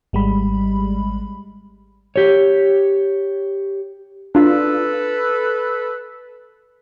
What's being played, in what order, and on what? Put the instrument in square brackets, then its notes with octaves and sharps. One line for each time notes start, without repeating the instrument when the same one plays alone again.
[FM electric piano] G#1 G3 G#3 B5
[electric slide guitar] G4 C#5
[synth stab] D4 F4 [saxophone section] A4 B4